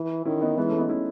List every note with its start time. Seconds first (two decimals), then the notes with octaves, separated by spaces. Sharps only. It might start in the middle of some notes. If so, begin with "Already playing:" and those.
Already playing: E3
0.25 D#3 C#4 E4
0.41 B3 D#4
0.57 E3 G#3 B3
0.68 A3 C#4
0.78 B3 D#4
0.89 C#4 E4